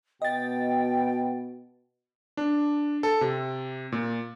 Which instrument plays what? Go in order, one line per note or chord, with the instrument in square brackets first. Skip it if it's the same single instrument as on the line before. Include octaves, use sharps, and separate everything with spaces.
[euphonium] B2 [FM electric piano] D#5 A6 [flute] G5
[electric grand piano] D4
A4
C3
A#2